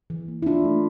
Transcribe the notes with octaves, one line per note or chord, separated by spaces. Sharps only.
E3
A#3
E4
E3 D4 F4
A3